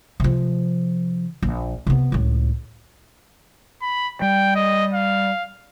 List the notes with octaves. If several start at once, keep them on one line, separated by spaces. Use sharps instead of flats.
C3 F3
A#1
C3 B3
C#2 A2
B5
G3 G5
D#5
F5